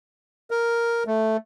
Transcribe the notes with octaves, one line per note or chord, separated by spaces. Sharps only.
A#4
A3